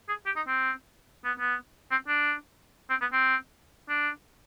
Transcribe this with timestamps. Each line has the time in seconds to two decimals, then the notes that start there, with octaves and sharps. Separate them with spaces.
0.08 G#4
0.26 G4
0.36 D#4
0.47 C4
1.24 B3
1.39 B3
1.91 C4
2.08 D4
2.89 C4
3.01 B3
3.12 C4
3.89 D4